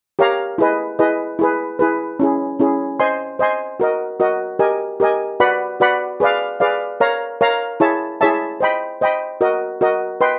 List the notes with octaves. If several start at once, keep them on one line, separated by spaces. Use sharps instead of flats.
G4 A#4 C#5 F5 A#5
E4 G#4 B4 D#5
E4 G#4 B4 D#5
E4 G#4 B4
E4 G#4 B4
C#4 E4 G#4
C#4 E4 G#4
C5 D#5 G#5 C6
C5 D#5 G#5 C6
F#4 A#4 D#5
F#4 A#4 D#5
G4 A#4 D#5 G#5
G4 A#4 D#5 G#5
F#4 B4 D5 F#5 B5
F#4 B4 D5 F#5 B5
G#4 B4 D5 F5
G#4 B4 D5 F5
A#4 C#5 F5 A#5
A#4 C#5 F5 A#5
E4 G#4 C#5 E5 A5
E4 G#4 C#5 E5 A5
C5 D#5 G5 B5
C5 D#5 G5 B5
F#4 A#4 D#5
F#4 A#4 D#5
B4 D#5 G5 C6